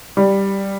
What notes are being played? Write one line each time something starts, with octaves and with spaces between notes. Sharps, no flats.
G3